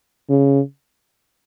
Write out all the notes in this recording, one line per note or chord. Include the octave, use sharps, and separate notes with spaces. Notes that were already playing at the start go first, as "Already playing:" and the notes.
C#3